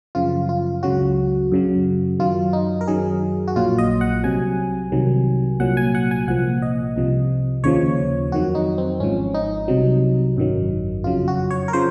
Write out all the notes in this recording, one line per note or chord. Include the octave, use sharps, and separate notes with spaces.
F#2 C#3 F3 F4
F4
C#2 C#3 F#3 F#4
F#2 C#3 F#3
F#2 D#3 F#3 F4
D#4
A#4
F#2 D#3 F#3 G#4
F#4
A#1 A#2 F#3 F4
D#5
F#5
C2 C3 F#3 G#5
C2 C3 D#3 F#3
C2 A#2 F#3 F#5
G#5
F#5
G#5
C2 A#2 F3 F#5
D#5
C2 C3 F3
D#2 C#3 F3 C#5
F2 D#3 F#3 F#4
D#4
C4
G#1 G#2 F3 C#4
D#4
C2 C3 F#3
G#1 F#2 D#3 F#3
F2 C#3 F#3 F4
F#4
C#5
A#4
C#3 F3 C5